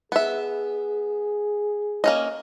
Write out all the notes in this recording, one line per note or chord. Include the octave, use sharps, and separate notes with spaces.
B3 G#4 E5
A#3 C#4 D#5